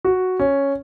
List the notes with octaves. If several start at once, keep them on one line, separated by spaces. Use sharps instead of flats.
F#4
C#4